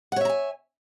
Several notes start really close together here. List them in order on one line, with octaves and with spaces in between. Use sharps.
F#5 C#5 E5 A#5 G#5